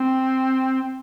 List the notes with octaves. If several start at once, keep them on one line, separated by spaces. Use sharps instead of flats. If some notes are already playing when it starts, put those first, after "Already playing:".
Already playing: C4